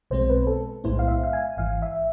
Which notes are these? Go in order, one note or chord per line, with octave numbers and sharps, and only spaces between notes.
B1 B2 G#3 C4 C5
B4
A4
B1 A2 G#3 B3 E4 C5
F5
E5
F5
G#5
G#1 G#2 E3 F5
E5